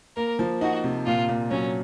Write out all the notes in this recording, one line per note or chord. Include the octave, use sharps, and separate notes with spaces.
A#3 A#4
F3
D#4 F#4
C3
A#2 F4
A#2
F#3 C#4